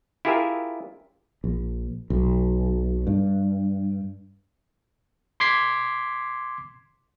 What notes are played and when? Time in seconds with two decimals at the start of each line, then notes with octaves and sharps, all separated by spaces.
0.25 E4 F4 G4 G#4 A#4 E5
1.44 A#1
2.10 B1
3.07 G2
5.40 C6 D6 G#6 B6 C7